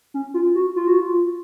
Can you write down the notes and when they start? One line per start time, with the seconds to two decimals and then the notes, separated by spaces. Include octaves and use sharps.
0.14 C#4
0.34 F4
0.55 F#4
0.76 F4
0.87 F#4
1.00 F4